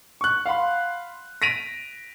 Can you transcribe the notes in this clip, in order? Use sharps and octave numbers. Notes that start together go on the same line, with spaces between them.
C#6 F#6
F5 F#5 B5 C6
A#6 B6 D7 D#7 F7